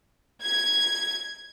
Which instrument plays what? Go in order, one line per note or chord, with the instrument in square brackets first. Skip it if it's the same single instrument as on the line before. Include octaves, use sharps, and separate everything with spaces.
[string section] G#6